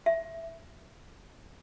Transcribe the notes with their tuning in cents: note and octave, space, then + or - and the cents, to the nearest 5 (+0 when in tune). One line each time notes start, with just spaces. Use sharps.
E5 +5